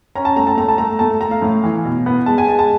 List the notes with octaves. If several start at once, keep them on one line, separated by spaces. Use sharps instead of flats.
C#4 A#5
A5
A3 A#5
A5
A3 A#5
A5
A3 A#5
A3 A5
A3 A#5
F5
A2
E3
B2
B3
G#3 A5
G#5
G#3 A5
A5